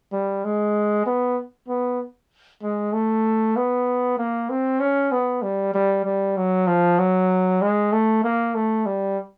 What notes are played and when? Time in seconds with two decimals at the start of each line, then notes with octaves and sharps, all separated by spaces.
0.13 G3
0.44 G#3
1.06 B3
1.68 B3
2.63 G#3
2.93 A3
3.56 B3
4.17 A#3
4.49 C4
4.80 C#4
5.12 B3
5.42 G3
5.74 G3
6.05 G3
6.36 F#3
6.67 F3
6.99 F#3
7.62 G#3
7.92 A3
8.24 A#3
8.54 A3
8.86 G3